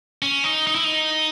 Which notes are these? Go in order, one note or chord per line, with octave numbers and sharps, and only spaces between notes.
C#4
D#4
D#4
E4
D#4